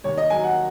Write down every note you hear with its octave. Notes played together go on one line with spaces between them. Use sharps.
D#2 C#5
D#5
F#3 G#5
F#5